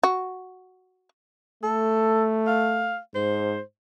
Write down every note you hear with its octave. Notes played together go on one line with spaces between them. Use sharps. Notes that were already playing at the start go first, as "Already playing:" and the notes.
F#4
A3 A4
F5
G#2 C5